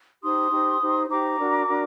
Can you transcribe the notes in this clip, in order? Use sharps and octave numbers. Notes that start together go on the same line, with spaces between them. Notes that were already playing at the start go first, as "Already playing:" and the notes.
D#4 G4 C5 C6 D#6
D#4 G4 C5
D#4 G4 C5
D#4 G4 C5 A#5 D6
D4 F#4 A#4
D4 F#4 A#4